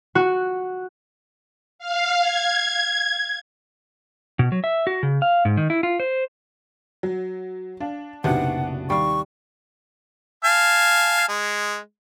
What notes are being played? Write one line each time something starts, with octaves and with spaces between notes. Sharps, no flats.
F#4
F5
G#6
B2
F#3
E5
F#4
C#3
F5
G#2
D#3
E4
F4
C5
F#3 F#4
D4 F5
F#1 B1 C3 B3 D4 F#4 F#5
D#2 G3 F5 C#6
F5 G#5 A5
G#3